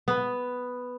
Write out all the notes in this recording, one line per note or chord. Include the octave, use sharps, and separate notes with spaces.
B3